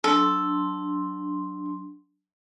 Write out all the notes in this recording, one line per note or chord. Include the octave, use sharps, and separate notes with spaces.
F#3 D4 A4 C6